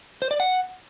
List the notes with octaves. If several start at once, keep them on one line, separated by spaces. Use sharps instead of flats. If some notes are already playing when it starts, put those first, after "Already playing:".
C5
D5
F#5